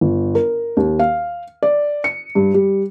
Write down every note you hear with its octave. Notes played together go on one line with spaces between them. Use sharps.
G1
A#4
D#2
F5
D5
C#7
G2
G3